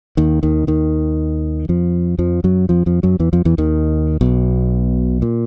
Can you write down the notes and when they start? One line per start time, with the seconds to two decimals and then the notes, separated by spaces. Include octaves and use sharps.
0.17 D#2 D#3
0.43 D#2 D#3
0.67 D#2 D#3
1.69 F2 F3
2.18 F2 F3
2.44 F#2 F#3
2.69 F2 F3
2.86 F2 F3
3.03 F#2 F#3
3.19 E2 E3
3.33 F2 F3
3.45 E2 E3
3.58 D#2 D#3
4.21 B1 B2
5.22 A#2